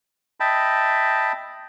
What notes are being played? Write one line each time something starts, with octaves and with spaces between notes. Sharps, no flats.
D#5 E5 G5 A5 B5